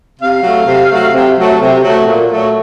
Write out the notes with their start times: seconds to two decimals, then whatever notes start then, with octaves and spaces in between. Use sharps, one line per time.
0.20 C3 F5
0.43 F#3 A3
0.67 C3
0.90 F#3 A3
1.13 C3
1.38 F#3 A3
1.61 C3
1.84 F#3 A3
2.07 A#2
2.31 F#3 A3